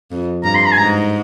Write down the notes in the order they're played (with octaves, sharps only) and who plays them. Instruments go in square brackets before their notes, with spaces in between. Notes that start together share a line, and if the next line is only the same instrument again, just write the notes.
[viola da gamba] F2
[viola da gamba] G2 [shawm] A#5
[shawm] C6
A#5
G#5
[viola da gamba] G#2 [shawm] A#5